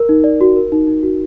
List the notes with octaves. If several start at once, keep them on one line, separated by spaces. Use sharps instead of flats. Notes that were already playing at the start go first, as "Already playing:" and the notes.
Already playing: A#4
D#4
D5
F#4
A#4
D#4
D#4
F#4